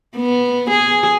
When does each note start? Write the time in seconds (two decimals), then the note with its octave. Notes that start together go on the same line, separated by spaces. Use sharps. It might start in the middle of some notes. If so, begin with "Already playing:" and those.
0.16 B3
0.70 G#4